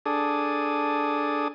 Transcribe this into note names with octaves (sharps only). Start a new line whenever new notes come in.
D4 G#4 A4 D#6